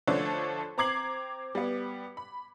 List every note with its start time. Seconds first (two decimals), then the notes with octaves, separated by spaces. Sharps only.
0.07 D3 F3 A3 D4 A4 C#5
0.78 C4 A#5 D6 G#6 C7 F#7
1.55 G3 B3
2.17 B5